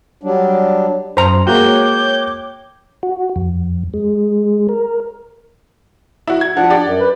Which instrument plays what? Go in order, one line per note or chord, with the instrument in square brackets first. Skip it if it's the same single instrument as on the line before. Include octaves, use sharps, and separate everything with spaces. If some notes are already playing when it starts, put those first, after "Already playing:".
[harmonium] F#3 G3 D4
[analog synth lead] F#2 [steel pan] C5 A#5
[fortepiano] G#3 A#3 F#4 [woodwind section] C#5 G5 D6 [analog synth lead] G6
[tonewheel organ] F#4
F2
G#3
A#4
[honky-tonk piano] E4 F#4
G#6
[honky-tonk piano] F3 [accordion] D4 F#5
[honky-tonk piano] G4 D5
[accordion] F#2
B4